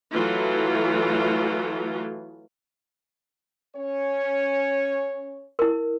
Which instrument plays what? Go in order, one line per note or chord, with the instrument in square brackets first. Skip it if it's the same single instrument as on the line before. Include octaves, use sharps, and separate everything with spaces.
[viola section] E3 F#3 A3 F4
[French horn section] C#4 C#5
[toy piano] E4 A#4